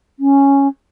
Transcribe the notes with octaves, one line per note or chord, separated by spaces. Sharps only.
C#4